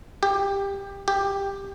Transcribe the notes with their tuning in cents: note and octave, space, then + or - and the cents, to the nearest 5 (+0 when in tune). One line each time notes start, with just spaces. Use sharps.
G4 +15
G4 +10